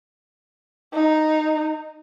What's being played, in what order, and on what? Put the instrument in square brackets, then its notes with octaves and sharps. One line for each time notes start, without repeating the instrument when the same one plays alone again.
[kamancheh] D#4